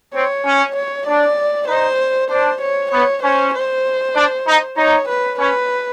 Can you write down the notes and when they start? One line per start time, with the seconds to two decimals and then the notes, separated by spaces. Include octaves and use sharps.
0.15 C4 C#5
0.45 C#4
0.76 C#5
1.07 D4 D5
1.68 D#4 C5
2.31 D4 C5
2.61 C#5
2.92 B3 C#5
3.23 C#4 C5
3.54 C5
4.16 D4
4.47 D#4
4.77 D#4 C#5
5.09 B4
5.40 C#4 B4